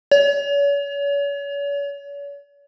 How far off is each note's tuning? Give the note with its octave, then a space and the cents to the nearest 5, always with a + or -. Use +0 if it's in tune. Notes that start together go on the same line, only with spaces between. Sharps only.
C#5 +40